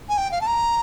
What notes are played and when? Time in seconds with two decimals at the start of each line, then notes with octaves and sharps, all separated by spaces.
0.09 G#5
0.17 G5
0.32 F5
0.41 A5
0.47 A#5